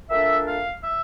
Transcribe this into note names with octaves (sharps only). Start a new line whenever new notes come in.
A#2 A3 D4 E5
F5
E5